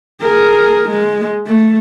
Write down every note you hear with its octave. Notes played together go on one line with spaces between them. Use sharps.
G#4 A#4
G#3
A3